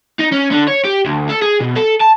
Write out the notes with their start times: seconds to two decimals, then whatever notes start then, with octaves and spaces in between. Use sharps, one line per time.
0.19 D#4
0.32 C#4
0.52 D3
0.68 C#5
0.85 G4
1.05 D2
1.29 A4
1.42 G#4
1.60 B2
1.76 A4
2.01 A5